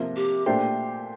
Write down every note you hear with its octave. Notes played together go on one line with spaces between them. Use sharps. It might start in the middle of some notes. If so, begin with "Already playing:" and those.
Already playing: C3 F3 A#3
G4
A#2 A3 D4 G4 C5